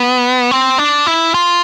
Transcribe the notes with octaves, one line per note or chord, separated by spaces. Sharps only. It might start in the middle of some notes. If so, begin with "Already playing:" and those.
Already playing: B3
C4
D4
E4
F4